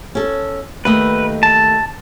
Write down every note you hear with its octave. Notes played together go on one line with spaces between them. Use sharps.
C#4 A4
D#2 A3 B4 D#5
A5